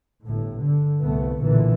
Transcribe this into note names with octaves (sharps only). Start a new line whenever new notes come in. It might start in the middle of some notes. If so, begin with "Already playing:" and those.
G1 A2
D3
C2 A3 B3
B1 A#2 D3 E3